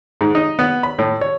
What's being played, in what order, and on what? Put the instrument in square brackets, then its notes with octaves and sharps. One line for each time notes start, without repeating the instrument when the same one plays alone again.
[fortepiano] G#2
D#4
B3
B5
A2
C#5